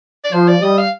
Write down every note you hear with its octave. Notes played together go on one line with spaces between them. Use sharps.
D5
F3 C5
D5
G3 D#5
F5